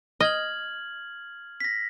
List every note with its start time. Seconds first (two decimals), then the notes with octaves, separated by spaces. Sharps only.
0.20 D#5 F6 G#6 F#7
1.60 A#6 B6